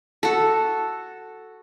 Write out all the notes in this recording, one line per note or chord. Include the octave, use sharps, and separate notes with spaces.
F#4 A4